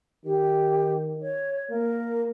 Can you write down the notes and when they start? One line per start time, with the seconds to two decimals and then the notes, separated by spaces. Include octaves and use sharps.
0.25 D#3 G4
1.22 C#5
1.70 A#3 A#4